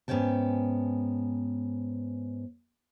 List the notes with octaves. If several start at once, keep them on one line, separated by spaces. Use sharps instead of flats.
G#2 B3 C#4 D5 G5 A5